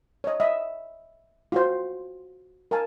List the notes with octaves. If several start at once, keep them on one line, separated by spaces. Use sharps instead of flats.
C#5 D#5
D#5 E5
F4 F#4 C5
A#4 F5 G#5 A5